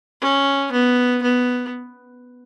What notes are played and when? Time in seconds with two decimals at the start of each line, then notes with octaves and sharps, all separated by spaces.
0.21 C#4
0.72 B3
1.23 B3